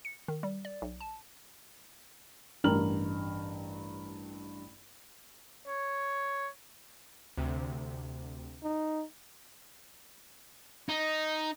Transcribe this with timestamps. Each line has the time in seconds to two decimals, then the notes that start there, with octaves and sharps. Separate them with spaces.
0.05 C#7
0.28 D#3
0.43 G3
0.65 D5
0.82 B1
1.00 A5
2.64 A1 G2 A#4 A#5 F6 F#7
5.67 C#5
7.37 D2 C3
8.63 D#4
10.89 D#4